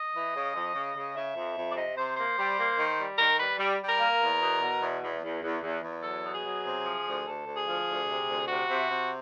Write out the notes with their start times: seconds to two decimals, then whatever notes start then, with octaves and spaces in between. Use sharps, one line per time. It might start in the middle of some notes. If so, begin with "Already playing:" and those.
Already playing: D#5
0.14 E3
0.34 C#3
0.54 F2
0.74 C#3
0.95 C#3
1.14 C#3 E5
1.35 F2
1.56 F2
1.69 D5
1.75 C3 D#5
1.97 C3 C5
2.16 A#3 C5
2.38 G3
2.58 A#3
2.77 D#3
2.99 G3
3.19 D#3 A#4
3.39 G3 B4
3.59 G3
3.80 G3
3.89 A#4
4.00 A#3
4.20 E2
4.41 B2
4.61 B2
4.82 E2
5.02 E2
5.22 E2
5.42 E2
5.62 E2
5.82 E2
6.03 F#3 A4
6.24 B2
6.34 G#4
6.44 F#3
6.65 C3
6.85 F3
7.05 D2
7.25 D2 A4
7.46 D2
7.56 G#4
7.67 F3
7.86 D2
8.07 C3
8.27 D2
8.47 C3 F#4
8.68 C3
8.88 C3